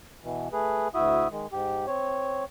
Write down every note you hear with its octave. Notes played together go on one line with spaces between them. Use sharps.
B2 E3
A3 G#4 B4
D2 E4 F#4 E5 D#6
D#3 G#3
G#2 G4
C4 C#5